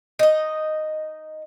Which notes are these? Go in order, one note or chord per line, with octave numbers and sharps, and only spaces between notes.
D#4 D#5